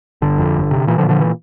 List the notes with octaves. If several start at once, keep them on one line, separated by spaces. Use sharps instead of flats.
G1 D3
F2
G1
C3
A#2 E3
D3 F3
A#2
D3 F3
E3